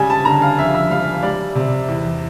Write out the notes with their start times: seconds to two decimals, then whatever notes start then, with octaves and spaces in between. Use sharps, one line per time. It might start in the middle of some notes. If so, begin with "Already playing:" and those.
Already playing: C#3 G3 G#5
0.10 A5
0.25 D3 A#5
0.42 F5
0.58 F2 E5
0.74 E5
0.90 G3 F5
1.23 G3 D5
1.55 C3
1.88 E2